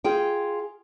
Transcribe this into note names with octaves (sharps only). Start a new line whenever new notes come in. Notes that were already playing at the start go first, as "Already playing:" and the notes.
F4 G#4 G5